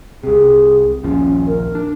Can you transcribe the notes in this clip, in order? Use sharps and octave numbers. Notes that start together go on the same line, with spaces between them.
C2 C3 G#4
A#1 D#2 F3 C#4
A#4
D4